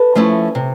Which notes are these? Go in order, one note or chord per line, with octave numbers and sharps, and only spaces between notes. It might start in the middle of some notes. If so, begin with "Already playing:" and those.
Already playing: A4 B4
F3 A3 C#4 E4
C3